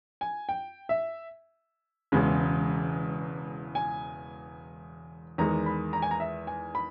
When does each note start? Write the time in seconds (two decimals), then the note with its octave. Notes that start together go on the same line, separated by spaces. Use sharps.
0.21 G#5
0.49 G5
0.89 E5
2.12 E1 E2 C#3 G#3
3.75 G#5
5.38 E2 D#3 G#3 A#5
5.66 B5
5.93 A#5
6.02 G#5
6.11 A#5
6.20 E5
6.47 G#5
6.75 B5